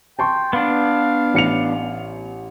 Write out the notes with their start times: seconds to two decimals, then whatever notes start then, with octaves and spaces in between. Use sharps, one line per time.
0.19 G5 A5 C6 C#6
0.53 B3 D4 F5
1.34 A1 C#7 F7